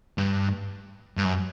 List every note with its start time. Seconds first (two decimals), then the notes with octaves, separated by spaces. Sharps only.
0.18 G2
1.17 G2
1.25 F#2